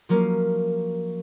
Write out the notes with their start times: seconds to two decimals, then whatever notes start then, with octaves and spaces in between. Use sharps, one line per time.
0.09 F3 F#3 A#3 C#4